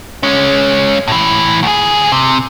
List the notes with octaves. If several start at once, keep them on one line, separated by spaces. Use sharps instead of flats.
G#3 C#4
A2 E3
D2 G#4
C3